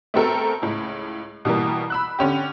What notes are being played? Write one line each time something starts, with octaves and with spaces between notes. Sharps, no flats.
A3 B3 C4 F#4 A4 A#4
C#2 A2
B2 E3 G3 A#3
B5 E6 F#6
D3 C#4 G4